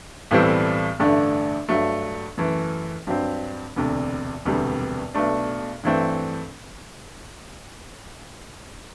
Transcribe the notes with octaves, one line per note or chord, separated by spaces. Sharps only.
B1 A2 E3 G3 C4
A1 G2 D3 A3 D4
G2 F#3 A3
F#2 E3 A3
G2 F#3 C4
E1 D2 C3
E1 D2 C3 G3 B3
B1 B2 A3 D4
G2 E3 A3 C4